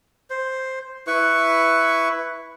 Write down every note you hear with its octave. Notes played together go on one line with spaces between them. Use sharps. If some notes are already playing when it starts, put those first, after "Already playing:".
C5
E4 B4 C#6